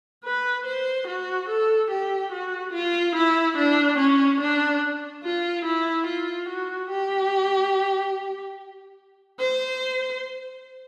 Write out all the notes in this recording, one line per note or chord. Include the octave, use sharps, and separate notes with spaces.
B4
C5
F#4
A4
G4
F#4
F4
E4
D4
C#4
D4
F4
E4
F4
F#4
G4
C5